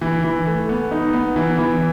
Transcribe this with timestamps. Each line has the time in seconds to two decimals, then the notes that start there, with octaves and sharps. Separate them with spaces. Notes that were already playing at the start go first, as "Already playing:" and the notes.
0.01 E3
0.24 E3
0.46 A3
0.69 B3
0.91 D#4
1.13 B3
1.36 E3
1.59 E3